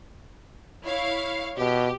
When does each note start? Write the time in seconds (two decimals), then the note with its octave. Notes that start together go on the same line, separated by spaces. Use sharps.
0.86 E4 C#5 F5
1.58 B2 G4